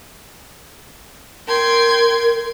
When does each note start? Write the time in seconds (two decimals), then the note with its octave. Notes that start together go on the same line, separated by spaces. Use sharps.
1.49 A#4 G5 C6 G#6